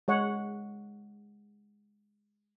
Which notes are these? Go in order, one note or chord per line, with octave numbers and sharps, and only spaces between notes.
G#3 C#5 F#5